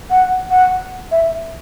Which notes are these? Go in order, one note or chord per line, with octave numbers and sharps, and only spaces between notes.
F#5
F#5
E5